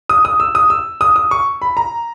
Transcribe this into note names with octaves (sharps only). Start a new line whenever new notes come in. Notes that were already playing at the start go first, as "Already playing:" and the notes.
D#6
D#6
E6
D#6
E6
D#6
D#6
C#6
B5
A#5